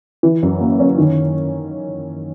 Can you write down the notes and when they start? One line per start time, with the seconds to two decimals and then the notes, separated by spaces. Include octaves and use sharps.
0.23 E3
0.43 F#2
0.60 A#3
0.80 C#4
0.98 D#3